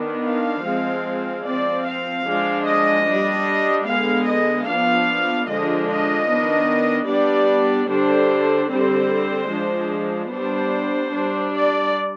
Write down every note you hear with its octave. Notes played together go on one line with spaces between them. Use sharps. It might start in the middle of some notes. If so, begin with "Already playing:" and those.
Already playing: D#3 B3 D4
F5
F3 G#3 C4
F3 C4 D5
F5
F3 G#3 D4
D#5
D4
G3
D3 G#3 B3 F5
D#5
F3 B3 D4 F5
D3 F3 G#3 D4 D#5
D#5
D#3 B3 D4
G3 B3 D4 D5
D3 G3 D4 C5
D3 G3 C4 C5
F3 G#3 D4
G3 B3 D4 C5
G3 D4
D5